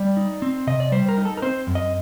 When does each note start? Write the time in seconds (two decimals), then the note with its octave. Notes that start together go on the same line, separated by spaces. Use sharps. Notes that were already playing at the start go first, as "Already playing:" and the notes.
Already playing: G3 D5
0.17 D#4
0.42 C4
0.67 C3 D#5
0.80 D5
0.92 G3 C5
1.09 A#4
1.18 D#4
1.25 A4
1.37 A#4
1.42 C4 C5
1.67 F#2
1.75 D#5